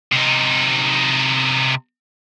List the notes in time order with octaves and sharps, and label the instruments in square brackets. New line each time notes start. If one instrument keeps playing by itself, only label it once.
[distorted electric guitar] C3 D#4